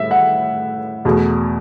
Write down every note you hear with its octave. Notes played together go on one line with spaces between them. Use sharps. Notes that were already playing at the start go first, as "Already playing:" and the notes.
Already playing: A2 G3 E5
F#5
E2 B2 A3